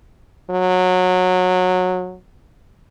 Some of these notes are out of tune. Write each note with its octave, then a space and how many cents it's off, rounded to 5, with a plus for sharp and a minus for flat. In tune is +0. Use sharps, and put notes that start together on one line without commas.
F#3 -20